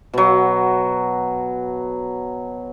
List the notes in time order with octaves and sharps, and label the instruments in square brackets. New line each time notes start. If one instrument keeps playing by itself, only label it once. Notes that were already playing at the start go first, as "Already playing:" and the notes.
[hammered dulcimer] B2 F#3